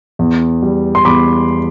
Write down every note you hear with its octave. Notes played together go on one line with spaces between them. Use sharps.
E2
G3
C6
E2 B5 D6